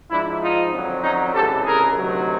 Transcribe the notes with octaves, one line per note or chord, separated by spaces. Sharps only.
G#2 F3 D4 E4
D#4 F4
F2 D3 F#3
C#4 D#4
C#2 C3 E3 G4 A4
G#4 A#4
D2 C3 D#3 F#3